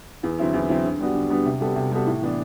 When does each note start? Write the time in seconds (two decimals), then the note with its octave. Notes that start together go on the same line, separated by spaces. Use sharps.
0.23 E2
0.39 D3 F#3 C4 E4
0.54 E2
0.68 D3 F#3 C4 E4
0.85 D3
1.00 G3 B3 D4 F#4
1.15 D3
1.30 G3 B3 D4 F#4
1.45 C3
1.61 G3 B3 F#4 A4
1.76 C3
1.91 G3 B3 F#4 A4
2.07 A2
2.22 E3 B3 D4